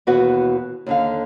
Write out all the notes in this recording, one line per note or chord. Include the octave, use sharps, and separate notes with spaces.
D#2 B2 E3 B3 F#4 B4
D#2 D3 F5